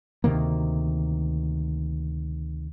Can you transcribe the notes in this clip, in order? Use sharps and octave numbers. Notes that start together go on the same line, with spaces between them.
D2 C3 D#3 A#3